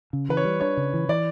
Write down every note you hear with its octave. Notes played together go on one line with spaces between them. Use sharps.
C#3
E3 B4
C#5
G3
D4 C#5
C#3
E3
E3 D5